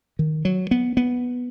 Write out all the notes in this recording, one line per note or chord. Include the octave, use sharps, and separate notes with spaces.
D#3
F#3
B3
B3